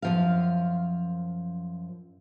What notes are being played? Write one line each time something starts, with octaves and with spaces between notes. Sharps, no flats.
F#2 F3 F5